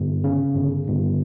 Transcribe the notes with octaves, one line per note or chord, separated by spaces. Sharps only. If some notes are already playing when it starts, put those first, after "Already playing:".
Already playing: G1
C#3
G1
G1